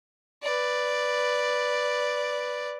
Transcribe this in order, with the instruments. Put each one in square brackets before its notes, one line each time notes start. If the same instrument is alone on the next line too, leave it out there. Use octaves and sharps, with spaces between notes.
[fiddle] B4 D5